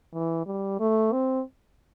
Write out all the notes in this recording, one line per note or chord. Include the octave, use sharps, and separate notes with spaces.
E3
G3
A3
C4